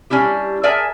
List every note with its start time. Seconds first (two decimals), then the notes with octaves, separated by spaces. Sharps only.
0.10 G3 C#4 D4 E4 G4
0.63 G#4 A#4 D5 E5 G#5 A5